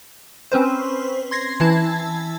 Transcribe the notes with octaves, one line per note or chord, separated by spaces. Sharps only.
C4 C#4 B4 C5
C6 G#6 A#6 C7
E3 E4 A5 G#6